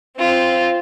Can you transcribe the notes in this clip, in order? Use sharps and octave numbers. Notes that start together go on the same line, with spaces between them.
C4 F4